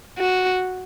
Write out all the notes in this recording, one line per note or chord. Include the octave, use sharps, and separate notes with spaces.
F#4